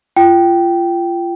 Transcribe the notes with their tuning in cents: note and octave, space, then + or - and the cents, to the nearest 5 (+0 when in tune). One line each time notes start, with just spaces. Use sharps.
F4 -25 G5 -10